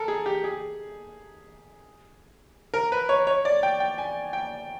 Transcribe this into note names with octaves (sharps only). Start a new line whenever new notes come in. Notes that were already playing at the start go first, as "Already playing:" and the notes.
Already playing: A4 A#4
G#4
G4
G#4
A#4
B4
C#5
C#5
D5
G5
G5
G#5
G5